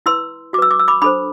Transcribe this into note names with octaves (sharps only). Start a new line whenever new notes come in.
E4 B4 C6 E6
F#4 D6
B4 E6
D6
E6
B5 D6
D4 A4 C5 B5 D6